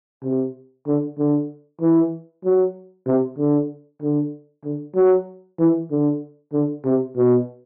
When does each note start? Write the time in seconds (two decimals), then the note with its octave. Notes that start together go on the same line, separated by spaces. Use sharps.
0.23 C3
0.87 D3
1.18 D3
1.81 E3
2.45 F#3
3.06 C3
3.38 D3
4.02 D3
4.64 D3
4.95 F#3
5.59 E3
5.90 D3
6.53 D3
6.85 C3
7.16 B2